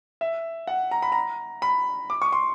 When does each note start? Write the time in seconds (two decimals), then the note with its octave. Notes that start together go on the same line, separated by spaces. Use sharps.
0.21 E5
0.67 F#5
0.91 A#5
1.02 B5
1.12 A#5
1.62 B5
2.10 D6
2.22 C#6
2.33 C6